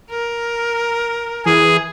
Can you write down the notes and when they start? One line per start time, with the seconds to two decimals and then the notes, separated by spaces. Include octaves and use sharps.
0.10 A#4
1.46 E3 G#4